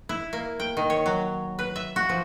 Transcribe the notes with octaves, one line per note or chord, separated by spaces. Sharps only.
E4
A#3
G5
D#3
C#5
F#3
B4
E5
F#4
F3